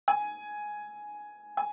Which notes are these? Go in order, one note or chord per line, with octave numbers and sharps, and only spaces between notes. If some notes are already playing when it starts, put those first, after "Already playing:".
G#5
G#5